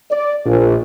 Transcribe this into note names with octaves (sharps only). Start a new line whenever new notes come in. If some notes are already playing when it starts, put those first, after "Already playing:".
D5
A#1